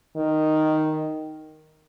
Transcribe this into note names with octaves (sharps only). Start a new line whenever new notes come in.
D#3